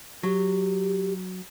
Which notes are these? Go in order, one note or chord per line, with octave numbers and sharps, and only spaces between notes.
F#3 G4